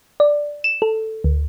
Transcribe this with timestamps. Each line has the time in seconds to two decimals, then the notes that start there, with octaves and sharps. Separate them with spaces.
0.20 D5
0.64 E7
0.82 A4
1.24 D2